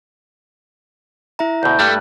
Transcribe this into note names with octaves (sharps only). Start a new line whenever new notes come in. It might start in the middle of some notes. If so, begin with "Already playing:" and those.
E4 E5 A#5
D2 B2 G5
G2 G3 A3 F#6